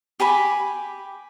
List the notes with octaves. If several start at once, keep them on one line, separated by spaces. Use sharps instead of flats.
G4 G#5 B5 D6